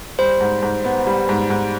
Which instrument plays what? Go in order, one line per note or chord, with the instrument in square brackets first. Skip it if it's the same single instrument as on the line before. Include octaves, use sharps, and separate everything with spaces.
[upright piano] G3 [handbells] C5
[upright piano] G#2
G#2
B3
G3
G#2
G#2